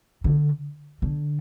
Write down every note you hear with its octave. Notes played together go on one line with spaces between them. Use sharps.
D3
D3